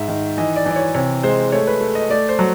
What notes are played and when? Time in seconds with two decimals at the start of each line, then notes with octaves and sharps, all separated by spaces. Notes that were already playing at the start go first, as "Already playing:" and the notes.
Already playing: G#2 E5
0.08 D#3
0.38 E3 D#5
0.56 D5
0.66 E3
0.71 D5
0.76 C#5
0.94 C3 C#5
1.23 G#3 C5
1.52 A3 C#5
1.67 B4
1.81 A3
1.95 D#5
2.10 A3 D5
2.29 C5
2.39 F#3